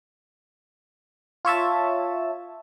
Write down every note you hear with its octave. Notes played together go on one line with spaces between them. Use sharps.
F4 C#5 E5 A5